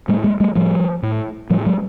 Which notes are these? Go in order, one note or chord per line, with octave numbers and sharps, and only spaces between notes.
A2 G3 A3
G#3 A#3
G3 A3
A2 F3 G3
A2
A2 F3 G3
F#3 G#3